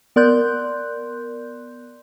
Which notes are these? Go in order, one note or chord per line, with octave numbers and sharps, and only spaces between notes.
B3 A#4 D5 C6 F#6 G6